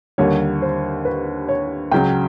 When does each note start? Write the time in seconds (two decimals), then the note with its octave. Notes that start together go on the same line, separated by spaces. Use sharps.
0.18 D#2 D3 G3 C#5
0.62 C5
1.05 B4
1.48 C#5
1.91 C#2 C#3 F#3 G5